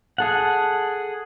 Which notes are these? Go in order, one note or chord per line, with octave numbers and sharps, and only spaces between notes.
G#4 A4 F#5